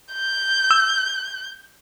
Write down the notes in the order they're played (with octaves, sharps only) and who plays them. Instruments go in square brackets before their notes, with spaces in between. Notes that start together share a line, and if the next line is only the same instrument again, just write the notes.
[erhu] G6
[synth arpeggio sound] E6